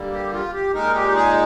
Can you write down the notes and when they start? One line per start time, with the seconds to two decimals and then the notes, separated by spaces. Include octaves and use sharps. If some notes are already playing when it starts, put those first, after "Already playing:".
Already playing: D3 G3 A#3
0.13 G4
0.33 F4
0.53 G4
0.74 A#2 G#3 D#4 A#4
0.95 G4
1.16 G#4